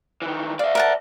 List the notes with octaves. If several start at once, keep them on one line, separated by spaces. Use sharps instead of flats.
D#3 E3
D5 E5 F5
A#4 F#5 A5